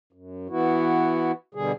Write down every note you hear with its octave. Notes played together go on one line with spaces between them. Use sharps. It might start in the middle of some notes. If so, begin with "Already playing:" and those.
F#2
E3 B3 E4 F#4
B2 D3 G3 G#4